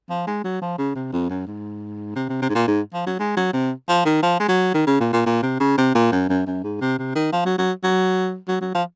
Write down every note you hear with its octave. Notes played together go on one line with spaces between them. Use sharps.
F3
G#3
F#3
F3
C#3
C3
F2
F#2
G#2
C3
C3
C3
G#2
A#2
G#2
F3
F#3
G#3
F#3
C3
F3
D#3
F3
G#3
F#3
D#3
C#3
A#2
A#2
A#2
C3
C#3
C3
A#2
F#2
F#2
F#2
G#2
C3
C3
D#3
F3
F#3
F#3
F#3
F#3
F#3
F3